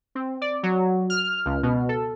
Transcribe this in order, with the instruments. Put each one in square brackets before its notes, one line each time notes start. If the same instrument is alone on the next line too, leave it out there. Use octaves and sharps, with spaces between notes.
[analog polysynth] C4
D5
F#3
F6
C#2
B2
A4